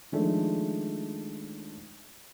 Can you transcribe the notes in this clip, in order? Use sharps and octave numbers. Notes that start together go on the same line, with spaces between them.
D#3 F3 G#3 A3 D4